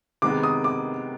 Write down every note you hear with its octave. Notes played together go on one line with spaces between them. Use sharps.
C3 D#3 G#3 B3 D#4 D6
D#6
D6